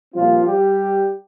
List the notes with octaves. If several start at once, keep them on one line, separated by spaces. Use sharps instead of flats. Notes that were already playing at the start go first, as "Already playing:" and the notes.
A#2 F3 G3 C4 F4
G3 G4